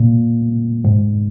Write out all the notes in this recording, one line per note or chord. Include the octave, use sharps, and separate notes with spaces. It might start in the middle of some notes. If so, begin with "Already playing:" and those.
Already playing: A#2
G#2